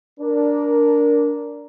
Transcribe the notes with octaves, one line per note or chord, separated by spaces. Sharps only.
D4 A#4